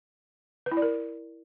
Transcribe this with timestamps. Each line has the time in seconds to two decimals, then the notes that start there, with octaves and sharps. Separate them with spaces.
0.66 B4
0.72 E4
0.77 D5
0.82 A#4